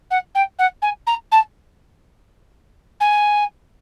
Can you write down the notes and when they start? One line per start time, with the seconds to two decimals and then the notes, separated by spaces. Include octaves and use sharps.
0.10 F#5
0.35 G5
0.58 F#5
0.82 G#5
1.06 A#5
1.31 A5
3.00 G#5